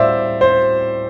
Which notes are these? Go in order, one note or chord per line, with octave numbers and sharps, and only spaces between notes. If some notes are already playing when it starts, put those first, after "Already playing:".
Already playing: A2 G3 C5 D5 E5 F5
C5